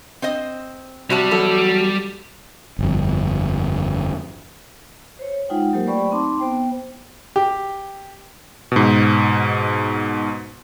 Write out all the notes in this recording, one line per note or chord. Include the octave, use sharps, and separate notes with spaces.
C4 C5 D#5
C3 G3 C4 F#4 A5
E2 F#3 A4
G1 F2
C5 C#5
G#3 D#4 F4 F#5 G5
F#3 A#3 G4 A#4 C5
A3 B4 D5 G5 B5 C#6
C4 D#4 A5 C6 D6
B3 C5 G5
G4
G#2 B2